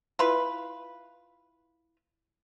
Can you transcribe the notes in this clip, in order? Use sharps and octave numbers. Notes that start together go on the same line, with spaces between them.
E4 F4 B4